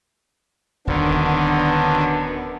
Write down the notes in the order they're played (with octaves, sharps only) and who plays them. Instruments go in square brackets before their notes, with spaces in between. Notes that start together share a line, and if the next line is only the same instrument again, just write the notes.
[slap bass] D#1 [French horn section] F#2 B3 D4 [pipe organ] D3 D#3